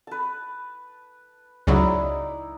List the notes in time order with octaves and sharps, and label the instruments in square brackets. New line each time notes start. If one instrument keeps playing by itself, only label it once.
[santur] B4 A5
[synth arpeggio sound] C#2 F#3 [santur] D#4 E4 D5